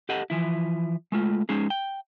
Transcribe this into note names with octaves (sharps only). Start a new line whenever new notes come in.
G4 A4 D#5 F#5
E3 F3 E4
G#3 A3 F4
G#3 C#4 D#4 G#4
G5